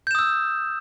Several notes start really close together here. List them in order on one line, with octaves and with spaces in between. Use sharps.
G6 E7 D#6 E6